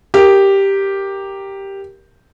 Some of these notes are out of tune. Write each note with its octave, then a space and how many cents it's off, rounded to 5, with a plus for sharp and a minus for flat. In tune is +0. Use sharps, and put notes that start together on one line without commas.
G4 +0 A#4 +0